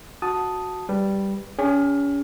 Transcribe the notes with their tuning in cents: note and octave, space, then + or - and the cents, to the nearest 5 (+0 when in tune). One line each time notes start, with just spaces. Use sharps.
F#4 +0 A5 +0 D#6 +0
G3 +0 B4 +0
C#4 +30 G#4 -40